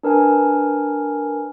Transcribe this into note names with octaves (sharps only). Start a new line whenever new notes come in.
D4 A#4 B4 G#5